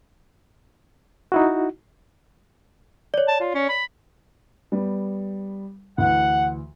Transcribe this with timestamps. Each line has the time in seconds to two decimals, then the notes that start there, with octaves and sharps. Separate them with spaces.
1.32 D#4 E4 F#4
3.14 C#5 D5
3.28 A5
3.41 F4
3.54 C#4
3.69 B5
4.72 G3 B3
5.98 D2 E3 F#5